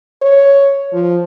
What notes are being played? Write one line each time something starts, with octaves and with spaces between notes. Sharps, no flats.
C#5
F3